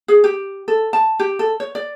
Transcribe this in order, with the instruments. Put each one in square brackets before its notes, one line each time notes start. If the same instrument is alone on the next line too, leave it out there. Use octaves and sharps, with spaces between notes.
[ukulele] G#4
G4
A4
A5
G4
A4
C#5
D5